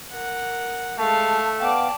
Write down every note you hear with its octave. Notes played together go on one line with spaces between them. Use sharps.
A#4 F#5
G#3 A3 F5 A5
B3 D5 F5 G5 A5